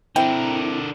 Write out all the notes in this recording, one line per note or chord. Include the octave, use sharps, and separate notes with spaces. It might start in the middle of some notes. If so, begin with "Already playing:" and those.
D3 C4 E4 A#4 G5